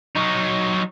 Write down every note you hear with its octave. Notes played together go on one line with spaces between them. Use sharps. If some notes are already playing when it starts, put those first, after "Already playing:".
F#3 D#4